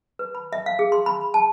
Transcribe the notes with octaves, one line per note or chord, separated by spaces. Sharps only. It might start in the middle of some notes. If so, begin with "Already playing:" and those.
B4
B5
E5
F5
G#4
C6
B5
B5
A5